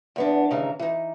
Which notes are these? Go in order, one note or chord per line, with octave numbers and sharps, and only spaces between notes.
E2 B3 D4
D#2 G#2 C#3 E3 A#5
E3 D#4